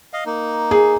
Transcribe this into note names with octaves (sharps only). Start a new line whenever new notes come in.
D#5 F5
A#3 D#4
G#4